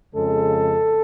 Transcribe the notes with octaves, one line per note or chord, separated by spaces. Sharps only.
F2 C#3 G#3 A4